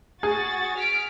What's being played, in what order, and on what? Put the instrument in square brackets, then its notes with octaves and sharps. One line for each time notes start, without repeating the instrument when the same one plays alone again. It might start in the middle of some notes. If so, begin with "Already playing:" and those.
[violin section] F#4 A6 [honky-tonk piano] G#4
[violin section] F6 B6 D7